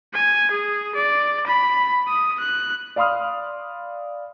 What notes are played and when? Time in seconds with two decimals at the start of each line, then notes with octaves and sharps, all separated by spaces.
0.14 G#5
0.51 G#4
0.95 D5
1.47 B5
2.08 D#6
2.40 F#6
2.96 D5 F5 B5 C6 D#6 F6